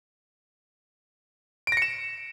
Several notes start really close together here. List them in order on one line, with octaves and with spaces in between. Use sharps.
D7 A#6 C#7 E7